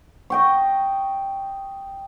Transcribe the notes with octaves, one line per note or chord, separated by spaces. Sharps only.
D#5 G5 C#6